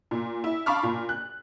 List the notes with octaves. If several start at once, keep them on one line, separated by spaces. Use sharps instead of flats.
A#2
E4
F5 A5 B5 C#6 D6 F6
A#2
F#6